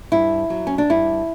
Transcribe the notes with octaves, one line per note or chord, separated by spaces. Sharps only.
G2 E4
F#3
C#4
D4
G2 E4